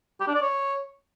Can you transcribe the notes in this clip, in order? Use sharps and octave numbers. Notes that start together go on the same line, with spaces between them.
G4
D4
D5
C#5